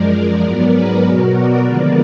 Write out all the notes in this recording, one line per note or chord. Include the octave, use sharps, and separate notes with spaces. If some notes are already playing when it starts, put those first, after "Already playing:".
Already playing: F#2 F3 G#3 A#4 D5
G#2 F#3 B3 A#4 D5
G#4 B4
B2 F#3 B3 F#4 A#4
A#4 D5
D#2 D3 F3 G#3 B3